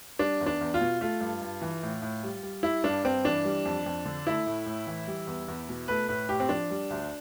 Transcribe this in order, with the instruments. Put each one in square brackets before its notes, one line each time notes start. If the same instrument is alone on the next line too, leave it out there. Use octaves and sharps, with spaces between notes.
[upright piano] G3 D4
E2
D4
E2
F4
B2
A3 F4
G2
G2
E3
A2
A2
G3
G3
G3 E4
G2 D4
G2 C4
E3 D4
G3
F2
F2
D3
A3 E4
A2
A2
E3
G3
E2
E2
B2
A3 B4
A2 B4
A2 G4
C4
F3 D4
G3
D2